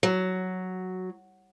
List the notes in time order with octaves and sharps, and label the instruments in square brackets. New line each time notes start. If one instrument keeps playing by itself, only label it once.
[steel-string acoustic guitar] F#3